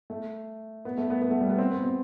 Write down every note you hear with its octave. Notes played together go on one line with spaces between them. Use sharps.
A3
B3
A3
B3
B3
A3
G3
B3
C4
B3
C4